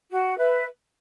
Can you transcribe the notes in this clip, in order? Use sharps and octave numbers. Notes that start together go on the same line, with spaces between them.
F#4
B4 E5